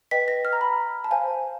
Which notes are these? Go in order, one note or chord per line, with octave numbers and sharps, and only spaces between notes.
B4 D#5 G5 B6
A#6
F6
A#5
B5
A5
C5 F5 G#5